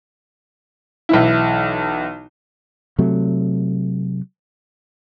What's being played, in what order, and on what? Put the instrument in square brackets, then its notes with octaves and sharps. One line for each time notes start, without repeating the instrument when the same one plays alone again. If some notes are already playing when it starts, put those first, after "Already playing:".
[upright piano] B1 E3 E4
[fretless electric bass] C3 F#3 A3